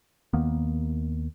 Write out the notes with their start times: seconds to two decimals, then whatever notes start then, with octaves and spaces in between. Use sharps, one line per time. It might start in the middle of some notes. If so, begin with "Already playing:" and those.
0.33 D#2 D#3 A#3 B3